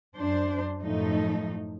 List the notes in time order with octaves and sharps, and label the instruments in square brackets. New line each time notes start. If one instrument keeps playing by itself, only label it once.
[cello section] F#2 D4 C5
F#2 A2 F3 A3 D#4